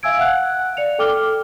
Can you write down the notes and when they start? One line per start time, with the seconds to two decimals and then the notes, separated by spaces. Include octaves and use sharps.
0.03 E5 F5 G#5 E6 G#6 D7
0.18 F5 F#5 F#6
0.77 D5 C#7 F7
0.99 A4 G5 D6 F6 G7